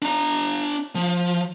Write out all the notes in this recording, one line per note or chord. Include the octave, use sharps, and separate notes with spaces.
D4 A#5
F3